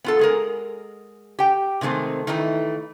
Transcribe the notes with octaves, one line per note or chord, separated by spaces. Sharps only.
B3 F4 A4
G#3 G#4 A#4
G4 G5
C3 D#3 G#3 A3 C4
D#3 E3 A3 D#4 E4